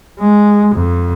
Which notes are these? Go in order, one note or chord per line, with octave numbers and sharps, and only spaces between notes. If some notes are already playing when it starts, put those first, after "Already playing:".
G#3
F2